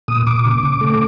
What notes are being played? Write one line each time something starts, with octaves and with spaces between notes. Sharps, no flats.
A#2 D#6
A#2 D6
C#3
C#3
A3